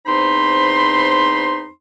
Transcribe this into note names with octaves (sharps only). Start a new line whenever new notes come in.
E2 C4 D#4 C5 B5 C6